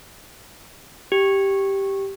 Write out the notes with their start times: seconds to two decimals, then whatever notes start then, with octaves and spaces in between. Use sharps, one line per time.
1.12 G4